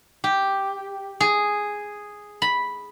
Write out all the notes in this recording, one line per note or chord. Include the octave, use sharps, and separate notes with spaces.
G4
G#4
B5